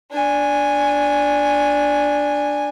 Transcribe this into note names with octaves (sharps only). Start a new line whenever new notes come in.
D4 G#5